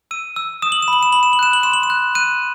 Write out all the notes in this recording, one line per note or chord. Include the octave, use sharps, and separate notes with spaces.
E6 D#7
E6
D#6 E7
F#7
E7
B5 F#7
E7
B5 F#7
E7
F#7
F#6 E7
F#7
C6 E7
F#7
E7
F#6
F#6 D#7